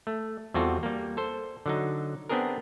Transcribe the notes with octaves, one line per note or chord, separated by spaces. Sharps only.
A3
E2 G3 C4 F4 F#4 A4
G3 A#3
A4 C5
D3 F#3 D#4
B3 C4 D4 G#4 A#4